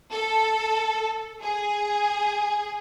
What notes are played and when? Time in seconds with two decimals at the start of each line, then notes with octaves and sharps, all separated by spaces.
0.12 A4
1.42 G#4